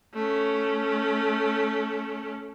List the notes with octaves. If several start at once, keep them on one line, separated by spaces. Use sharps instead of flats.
A3 C#4